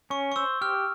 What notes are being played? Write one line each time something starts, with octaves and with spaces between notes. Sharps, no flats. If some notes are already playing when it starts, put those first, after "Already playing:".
C#4 C#6
C#6
C5 E6
G4 F6